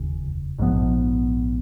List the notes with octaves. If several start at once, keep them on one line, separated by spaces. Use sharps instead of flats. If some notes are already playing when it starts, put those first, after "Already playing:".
Already playing: F1 D#2 C#3
A#1 G#2 F3 B3